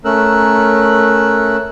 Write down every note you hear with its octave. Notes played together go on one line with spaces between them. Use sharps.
A3 C#4 A#4 E6 F#6